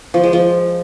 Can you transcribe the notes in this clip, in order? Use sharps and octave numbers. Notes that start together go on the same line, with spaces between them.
F3
G#3
F3